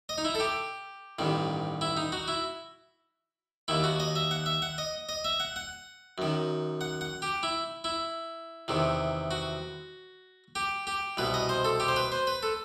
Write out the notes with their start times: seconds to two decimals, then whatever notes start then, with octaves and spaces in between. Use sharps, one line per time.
0.09 D#5
0.18 D#4
0.24 E4
0.35 A4
0.40 G4
1.19 A1 G2 D#3
1.81 E4
1.97 D#4
2.12 F#4
2.28 E4
3.68 D#2 D#3 E4
3.84 F#4
4.00 D#5
4.15 E5
4.31 F#5
4.46 E5
4.62 F#5
4.78 D#5
5.09 D#5
5.25 E5
5.40 F#5
5.56 F#5
6.18 F#2 D#3
6.81 F#5
7.01 F#5
7.22 G4
7.43 E4
7.84 E4
8.68 E2 C3 D#3
9.31 F#4
10.55 G4
10.87 G4
11.17 C2 B2 B4
11.34 D#5
11.49 C5
11.65 A4
11.80 G4
11.88 C5
11.96 B4
12.12 C5
12.27 B4
12.43 A4